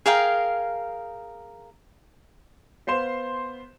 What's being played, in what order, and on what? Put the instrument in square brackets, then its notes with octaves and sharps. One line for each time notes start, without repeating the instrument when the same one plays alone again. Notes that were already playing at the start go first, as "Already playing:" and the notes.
[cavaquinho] G#4 A#4 F5 G5
[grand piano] B3 C5 F5 C6 E7